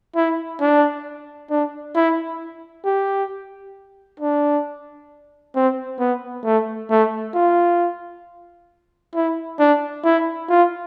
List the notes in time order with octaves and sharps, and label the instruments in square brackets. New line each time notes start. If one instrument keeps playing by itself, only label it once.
[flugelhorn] E4
D4
D4
E4
G4
D4
C4
B3
A3
A3
F4
E4
D4
E4
F4